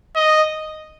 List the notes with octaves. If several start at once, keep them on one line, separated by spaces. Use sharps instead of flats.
D#5